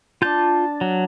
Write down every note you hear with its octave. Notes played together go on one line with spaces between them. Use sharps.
D4 F4 A5 G6
F#3